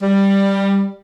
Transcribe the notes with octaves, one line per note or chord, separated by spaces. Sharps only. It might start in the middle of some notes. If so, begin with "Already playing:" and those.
G3